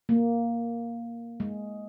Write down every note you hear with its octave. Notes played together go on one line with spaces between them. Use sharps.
A#3
G#3